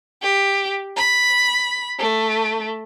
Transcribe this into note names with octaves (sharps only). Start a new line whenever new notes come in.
G4
B5
A3